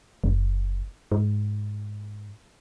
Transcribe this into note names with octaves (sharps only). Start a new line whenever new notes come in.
F#1
G#2